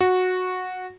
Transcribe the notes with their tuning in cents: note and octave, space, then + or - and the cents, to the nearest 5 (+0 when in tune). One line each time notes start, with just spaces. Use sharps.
F#4 -10